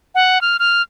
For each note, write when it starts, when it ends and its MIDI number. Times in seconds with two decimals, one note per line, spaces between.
0.15 0.41 78
0.41 0.57 89
0.59 0.82 89